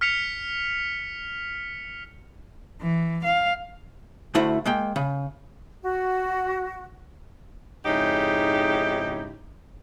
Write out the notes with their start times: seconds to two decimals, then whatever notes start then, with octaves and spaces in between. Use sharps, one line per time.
0.01 F6 B6 C#7 F7
2.81 E3
3.24 F5
4.35 D2 A3 E4 F#4 C5
4.66 G#3 A#3 G5
4.96 C#3
5.83 F#4
7.85 F2 G#2 C#3 D#4 E4 G4